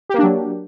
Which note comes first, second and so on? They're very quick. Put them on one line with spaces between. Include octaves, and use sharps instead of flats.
G4 A#3 D4 F#3